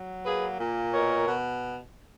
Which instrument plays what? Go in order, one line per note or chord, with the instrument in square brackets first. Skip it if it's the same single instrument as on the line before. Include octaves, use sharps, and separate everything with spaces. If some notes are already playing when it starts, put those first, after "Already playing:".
Already playing: [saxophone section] F#3
A#3 G#4 B4
A#2
B2 A#4 C#5
B2